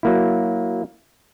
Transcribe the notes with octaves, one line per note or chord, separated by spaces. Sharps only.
F#3 A#3 E4